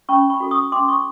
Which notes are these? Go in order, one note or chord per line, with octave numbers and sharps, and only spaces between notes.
C#4 B5 C#6
B5 C#6
F#4 A4
C#6 D#6
C#4 C6 D6
C#6 D#6